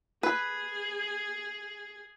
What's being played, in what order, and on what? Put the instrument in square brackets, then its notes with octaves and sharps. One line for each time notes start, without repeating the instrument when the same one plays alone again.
[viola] G#4 [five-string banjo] B4